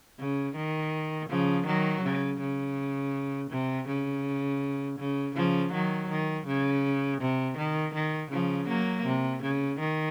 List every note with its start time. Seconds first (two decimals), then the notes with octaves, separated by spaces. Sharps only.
0.19 C#3
0.56 D#3
1.30 C#3 F3
1.66 D#3 F#3
2.03 C#3
2.41 C#3
3.51 C3
3.88 C#3
4.99 C#3
5.35 C#3 F3
5.73 D#3 F#3
6.10 D#3
6.47 C#3
7.21 C3
7.58 D#3
7.94 D#3
8.31 C#3 F3
8.68 F#3 A#3
9.06 C3
9.42 C#3
9.80 D#3